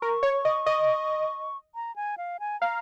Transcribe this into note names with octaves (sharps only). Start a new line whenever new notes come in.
A#4 C#6
C#5
D#5
D#5
A#5
G#5
F5
G#5
F5 A#5